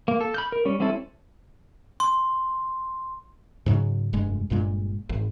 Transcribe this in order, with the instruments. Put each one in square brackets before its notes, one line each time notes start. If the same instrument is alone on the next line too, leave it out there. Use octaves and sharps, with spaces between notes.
[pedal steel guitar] A#3
A4
B5 F6 G6
A#4
G3 C#4
G3 C4 C#4 E4 A4
[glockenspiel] C6
[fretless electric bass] G#2 C#3 F#3
F1 G2 G#3
G1 G2 A#2 G#3
G#1